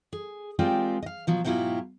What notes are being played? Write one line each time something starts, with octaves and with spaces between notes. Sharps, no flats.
G#4
G#3 C4 F4 G4 A#4 D5
D#5 F5
B2 F3 F#3
G#2 B2 F#3 E4 F4 G4